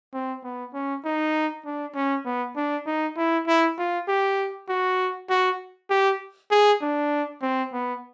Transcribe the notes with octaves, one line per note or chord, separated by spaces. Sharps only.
C4
B3
C#4
D#4
D4
C#4
B3
D4
D#4
E4
E4
F4
G4
F#4
F#4
G4
G#4
D4
C4
B3